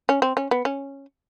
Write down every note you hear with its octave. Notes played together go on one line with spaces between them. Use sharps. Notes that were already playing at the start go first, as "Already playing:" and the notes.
C#4
C4
C#4
B3
C#4